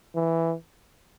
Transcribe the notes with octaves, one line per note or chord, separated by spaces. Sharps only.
E3